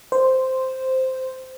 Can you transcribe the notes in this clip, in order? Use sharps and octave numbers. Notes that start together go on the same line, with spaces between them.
C5